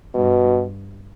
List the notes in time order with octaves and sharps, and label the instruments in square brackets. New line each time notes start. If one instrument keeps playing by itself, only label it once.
[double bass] G2 [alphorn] B2